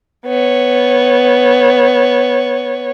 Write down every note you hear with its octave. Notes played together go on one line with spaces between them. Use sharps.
B3 C#5